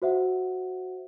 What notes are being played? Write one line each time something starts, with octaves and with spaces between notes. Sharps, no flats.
F#4 C5 E5 F#5